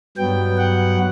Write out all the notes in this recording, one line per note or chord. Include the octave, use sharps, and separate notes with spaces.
G2 F#3 B3 G5
F#5